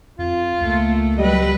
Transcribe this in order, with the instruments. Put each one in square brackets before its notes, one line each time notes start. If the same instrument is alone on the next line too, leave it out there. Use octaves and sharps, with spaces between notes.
[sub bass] F2 [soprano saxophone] F4
[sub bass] C#2 [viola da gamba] A3 A#3
[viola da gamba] F#3 B4 [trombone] G3 [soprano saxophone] D#5